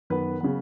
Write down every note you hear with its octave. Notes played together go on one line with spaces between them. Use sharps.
F#2 D#3 B3 B4
C#3 F#3 B3